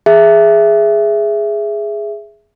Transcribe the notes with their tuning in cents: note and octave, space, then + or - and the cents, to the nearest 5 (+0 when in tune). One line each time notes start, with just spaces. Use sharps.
G#4 +0 E5 +10